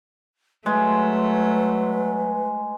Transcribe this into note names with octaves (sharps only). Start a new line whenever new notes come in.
F#3 G#3 A3 B4